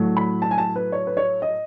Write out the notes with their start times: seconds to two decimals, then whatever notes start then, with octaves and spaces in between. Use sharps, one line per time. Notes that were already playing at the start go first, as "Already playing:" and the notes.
Already playing: A2 F#3 A3
0.17 B5
0.42 A5
0.51 G#5
0.58 A5
0.76 B4
0.92 C#5
1.07 B4
1.17 C#5
1.42 D#5